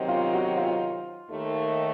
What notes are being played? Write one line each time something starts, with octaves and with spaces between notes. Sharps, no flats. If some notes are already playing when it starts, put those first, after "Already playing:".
Already playing: C3 D#3 F#3 C4 D#4
F4
F#4
F4
D#2 D#3 A3